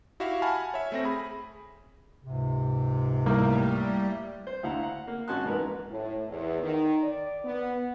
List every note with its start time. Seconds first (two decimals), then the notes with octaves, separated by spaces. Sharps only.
0.20 E4 F#4 G4 E5 F5
0.42 F#5 G#5 A5 B5 F6
0.74 C#5 E5
0.92 A3 C4 A#6
1.04 G#4 B5
2.23 C#2 G#2 C3
3.26 A2 G3 A#3
4.47 C5
4.63 D2 E4 F5 F#5 A#5
4.83 F#5
5.07 A#3
5.28 G#1 C#4 F#4 A5 C6 F#6
5.45 F2 G#2 E3 A#4 B4
5.91 A2
6.28 E2
6.62 D#3
7.03 D5
7.44 B3